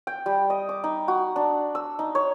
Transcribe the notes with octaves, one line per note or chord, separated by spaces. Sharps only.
G5
G3
D#5
D6
D#4
F#4
D4
E6
D#4
C#5